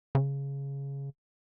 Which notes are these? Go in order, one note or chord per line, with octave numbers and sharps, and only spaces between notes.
C#3